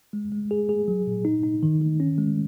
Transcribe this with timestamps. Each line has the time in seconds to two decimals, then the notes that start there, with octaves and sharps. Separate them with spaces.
0.13 G#3
0.32 G#3
0.51 G#4
0.69 G#4
0.88 F#3
1.07 A#2
1.25 D#4
1.43 D#4
1.63 D#3
1.81 D#3
2.00 C#4
2.18 G#3